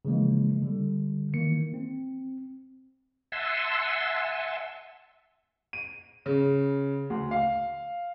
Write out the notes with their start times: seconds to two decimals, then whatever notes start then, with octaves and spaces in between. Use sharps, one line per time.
0.05 C#3 E3 F3 G#3 A#3
0.62 D3 G3
1.34 D#3 E3 A#3 C#7
1.74 C4
3.32 E5 F#5 G#5 A5 C6 E6
5.73 D#7
6.26 C#3
7.10 D2
7.31 F5